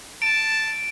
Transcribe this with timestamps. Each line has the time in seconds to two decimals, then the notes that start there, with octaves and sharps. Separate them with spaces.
0.22 A5 D7